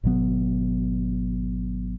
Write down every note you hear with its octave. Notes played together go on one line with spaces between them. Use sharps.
G#1 B2 F#3 B3